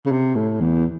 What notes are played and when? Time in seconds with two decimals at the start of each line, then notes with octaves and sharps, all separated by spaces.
0.06 C#3
0.11 C3
0.35 A2
0.60 E2